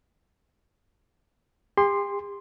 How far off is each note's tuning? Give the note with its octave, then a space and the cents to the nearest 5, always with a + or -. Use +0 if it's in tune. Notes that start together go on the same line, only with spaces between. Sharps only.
G4 +45 C6 +0